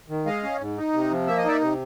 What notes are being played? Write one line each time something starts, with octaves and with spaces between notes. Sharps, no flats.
D#3
G#3 D#5 F5
C#4
G#2
D#4
C3
F3
A#3 E5
D#5
D#4 D5 E5
C3